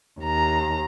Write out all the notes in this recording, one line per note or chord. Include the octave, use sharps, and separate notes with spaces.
D#2 A#5